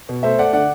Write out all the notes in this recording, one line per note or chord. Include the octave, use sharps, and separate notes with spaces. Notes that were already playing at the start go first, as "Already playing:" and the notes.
B2
A3 C5 E5
A3 D5 F#5
D3 D5 F#5